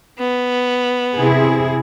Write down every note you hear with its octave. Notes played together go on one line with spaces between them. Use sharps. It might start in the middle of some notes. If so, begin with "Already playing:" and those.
B3
C3 E4 G#4